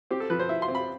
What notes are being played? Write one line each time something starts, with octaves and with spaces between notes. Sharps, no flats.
C4 G4
A4
F3 B4
C5
E4 E5
C6
C4
B5